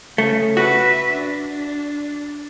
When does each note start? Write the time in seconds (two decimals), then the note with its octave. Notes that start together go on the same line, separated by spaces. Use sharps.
0.18 C#3 A3
0.57 F#4 B4 E5
1.13 D4